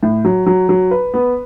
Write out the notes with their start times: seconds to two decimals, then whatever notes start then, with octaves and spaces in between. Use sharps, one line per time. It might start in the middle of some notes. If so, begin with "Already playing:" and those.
0.03 A2
0.25 F#3
0.46 F#3
0.69 F#3
0.91 B4
1.14 B3